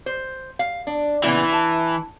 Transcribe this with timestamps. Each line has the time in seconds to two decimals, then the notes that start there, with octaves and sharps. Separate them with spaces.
0.06 C5
0.59 F5
0.87 D4
1.24 A#2 C#3 E3 B3
1.53 A5